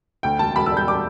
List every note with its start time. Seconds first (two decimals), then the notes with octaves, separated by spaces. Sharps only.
0.23 D2 G5
0.39 E1 A5
0.56 E1 B5
0.66 E6
0.71 G3
0.77 G6
0.87 G3 D6